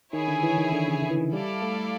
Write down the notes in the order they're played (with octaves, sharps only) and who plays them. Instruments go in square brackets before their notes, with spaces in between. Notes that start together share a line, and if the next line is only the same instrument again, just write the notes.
[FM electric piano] D#3 [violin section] E4 G#4 C#5 E5 G#5
[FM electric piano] D3
E3
D#3
D3
C#3
D3
E3
D#3
[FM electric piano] G3 [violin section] E4 A4 D5 F5
[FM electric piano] A3